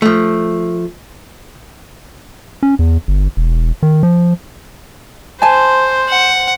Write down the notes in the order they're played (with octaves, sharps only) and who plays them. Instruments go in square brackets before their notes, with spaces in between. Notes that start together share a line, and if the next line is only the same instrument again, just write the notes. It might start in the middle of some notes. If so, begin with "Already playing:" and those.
[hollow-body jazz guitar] F3 A3
[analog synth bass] C#4
E2
G1
E1
D#3
F3
[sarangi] C5 [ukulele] G#5 A5
[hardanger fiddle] F#5